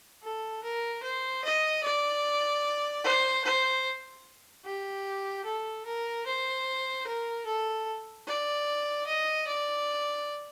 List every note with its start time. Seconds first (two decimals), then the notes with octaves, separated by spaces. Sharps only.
0.23 A4
0.63 A#4
1.03 C5
1.44 D#5
1.84 D5
3.04 C5
3.44 C5
4.65 G4
5.45 A4
5.85 A#4
6.26 C5
7.06 A#4
7.46 A4
8.27 D5
9.07 D#5
9.47 D5